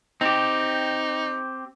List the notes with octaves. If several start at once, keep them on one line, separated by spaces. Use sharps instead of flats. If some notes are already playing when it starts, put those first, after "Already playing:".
C4 D#4 G4